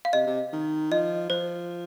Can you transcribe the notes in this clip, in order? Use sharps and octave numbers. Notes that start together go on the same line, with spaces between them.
F5
C3 D#5
C3
D#3
F3 D#5
F3 C5